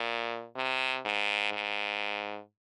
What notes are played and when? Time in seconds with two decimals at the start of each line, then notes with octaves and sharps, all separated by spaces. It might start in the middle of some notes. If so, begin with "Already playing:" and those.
Already playing: A#2
0.56 C3
1.05 G#2
1.53 G#2